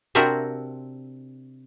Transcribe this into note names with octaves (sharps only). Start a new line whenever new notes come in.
C3 C4 D4 F#4 A#4 E5